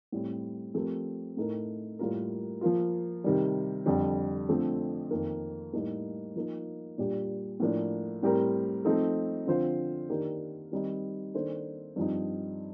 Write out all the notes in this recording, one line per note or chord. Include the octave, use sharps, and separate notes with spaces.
A2 G3 C4
F3 A3 C4 G4 A#4
A2 A3 D#4 A#4
A2 G3 A#3 F4 A#4
F3 A#3 F4
C3 D#3 G3
F2 D3 G3
D3 F3 A3 C4
F2 D#3 A#3
A2 G3 A#3 D#4
F3 A#3 D#4
A#2 G3 D4 G4
A2 F3 A#3 D4
A2 G3 C4 G4 A#4
F3 A3 C4 D#4 A4
D3 F3 C4 F4 C5
D#3 A#3 D4 G4 A#4
D#3 G3 C4 D#4
D#3 A#3 D4 A4 C5
G2 F3 C4 D#4